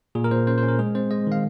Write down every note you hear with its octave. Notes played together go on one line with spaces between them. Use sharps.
A#2 G#4
A#4
A#2 C5
C#4 C5
C5
C#4
A#4
G#3 G#4
C4 C5
G#3 D#5
D#3 F5